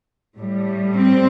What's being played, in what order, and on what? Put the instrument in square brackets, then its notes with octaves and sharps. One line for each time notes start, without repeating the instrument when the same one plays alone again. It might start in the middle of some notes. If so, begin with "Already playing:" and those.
[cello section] A2 G3
C4